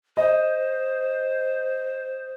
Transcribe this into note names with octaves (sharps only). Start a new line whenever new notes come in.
C5 D#5